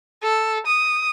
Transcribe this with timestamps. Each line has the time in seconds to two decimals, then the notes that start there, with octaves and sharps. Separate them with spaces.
0.23 A4
0.66 D#6